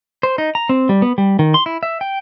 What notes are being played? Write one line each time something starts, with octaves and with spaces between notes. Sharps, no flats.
C5
D#4
A#5
C4
G3
B3
G3
D#3
C6
E4
E5
G5